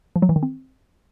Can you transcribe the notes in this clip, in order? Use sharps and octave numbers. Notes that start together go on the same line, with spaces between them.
F3
F#3
E3
D#3
C4